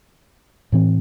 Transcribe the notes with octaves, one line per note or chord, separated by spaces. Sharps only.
A2 E3 C4